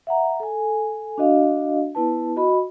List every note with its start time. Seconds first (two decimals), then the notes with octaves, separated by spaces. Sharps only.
0.07 E5 F#5 A#5
0.40 A4 G#5
1.18 D4 F#4 D#5 F5
1.95 B3 E4 B4 A5
2.36 F#4 D#5 B5